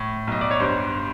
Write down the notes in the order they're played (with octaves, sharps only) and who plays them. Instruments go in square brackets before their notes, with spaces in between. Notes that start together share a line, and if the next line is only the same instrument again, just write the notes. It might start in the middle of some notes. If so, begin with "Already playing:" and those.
Already playing: [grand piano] A2
B1 D#5
D5
C#5
G2 C5